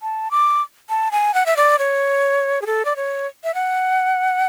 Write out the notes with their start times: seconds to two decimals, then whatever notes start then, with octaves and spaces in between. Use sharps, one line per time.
0.02 A5
0.31 D6
0.89 A5
1.11 G#5
1.34 F#5
1.46 E5
1.57 D5
1.79 C#5
2.62 G#4
2.66 A4
2.85 D5
2.96 C#5
3.44 E5
3.54 F#5